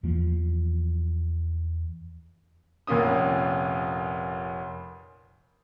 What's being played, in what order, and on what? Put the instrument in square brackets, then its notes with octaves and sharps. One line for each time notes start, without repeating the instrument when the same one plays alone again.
[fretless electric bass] E2 E3 F3 A#3
[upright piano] F1 A#2 A#3 C#4 D#6